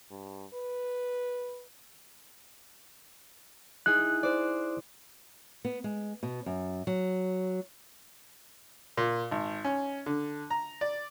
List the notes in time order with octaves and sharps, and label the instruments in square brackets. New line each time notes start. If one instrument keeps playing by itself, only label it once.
[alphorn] G2
B4
[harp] D#4 E4 G#4 [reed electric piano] F#6
[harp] C5 D5
[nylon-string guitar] B3
G#3
B2
F#2
F#3
[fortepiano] A#2
G#1
C#4
D3
A#5
D5